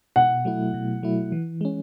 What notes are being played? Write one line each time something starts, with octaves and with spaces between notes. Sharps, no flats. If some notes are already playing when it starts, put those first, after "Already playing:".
B2 F#5
F#3 A3 E4
B2
F#3 A3 E4
E3
G#3 C#4